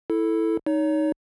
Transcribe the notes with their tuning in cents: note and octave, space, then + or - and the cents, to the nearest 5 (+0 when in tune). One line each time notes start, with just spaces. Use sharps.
E4 -5 A4 +0
D#4 +0 C#5 +30